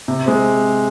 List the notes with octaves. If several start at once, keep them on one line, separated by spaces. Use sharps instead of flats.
C3
G#3 C4